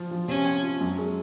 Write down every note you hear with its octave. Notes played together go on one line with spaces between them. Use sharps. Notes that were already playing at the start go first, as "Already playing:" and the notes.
Already playing: F3 F4
F3
C3 C#4
C4
F4
F#2
G#3